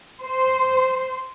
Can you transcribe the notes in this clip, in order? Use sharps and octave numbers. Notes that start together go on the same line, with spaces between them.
C5